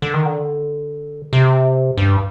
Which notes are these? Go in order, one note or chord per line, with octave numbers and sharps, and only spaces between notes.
D3
D#3
D3
C3
G2